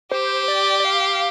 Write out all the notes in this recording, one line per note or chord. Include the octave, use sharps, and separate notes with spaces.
G4 C5
D5
D5
F5